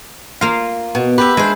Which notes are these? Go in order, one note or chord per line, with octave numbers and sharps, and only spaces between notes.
A#3 F4 F5
B2
G4 B4 E5
G#3 D4 C5